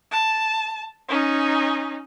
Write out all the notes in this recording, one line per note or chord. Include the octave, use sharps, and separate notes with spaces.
A5
C#4 D#4